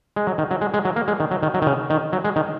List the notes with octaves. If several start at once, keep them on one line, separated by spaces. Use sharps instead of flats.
G#3
F#3
D#3
F#3
G#3
G#3
F#3
A#3
G#3
D#3
F#3
D#3
F#3
D#3
C#3
D#3
F#3
G#3
D#3